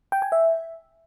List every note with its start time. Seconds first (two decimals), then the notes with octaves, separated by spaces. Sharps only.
0.12 G5
0.22 G#5
0.32 E5